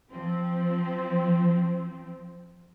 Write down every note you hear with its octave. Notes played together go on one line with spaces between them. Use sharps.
F3 C4